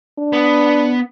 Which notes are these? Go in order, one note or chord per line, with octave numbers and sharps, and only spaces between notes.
D4
B3